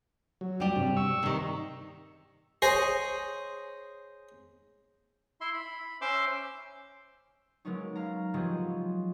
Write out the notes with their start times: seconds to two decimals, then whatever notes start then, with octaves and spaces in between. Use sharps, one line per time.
0.41 F#3
0.60 G3 G4
0.76 G2 C3
0.97 C#6 E6
1.23 C3 D#3
2.62 G#4 C5 C#5 D#5 G#5
5.41 E4 E5 C6
5.54 B5
6.01 C#4 C5 E5 C6 D6 E6
7.65 F#3 G#3 A#3 B3 C#4 D#4
7.95 F5 A#5
8.34 F3 F#3 B3 G4 G#4 D#5